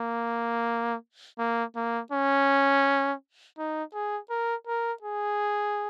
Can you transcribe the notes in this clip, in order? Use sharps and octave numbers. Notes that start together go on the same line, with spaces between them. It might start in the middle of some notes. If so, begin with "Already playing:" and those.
Already playing: A#3
A#3
A#3
C#4
D#4
G#4
A#4
A#4
G#4